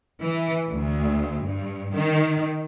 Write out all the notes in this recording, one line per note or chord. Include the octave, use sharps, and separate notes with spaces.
E3
D2
G2
D#3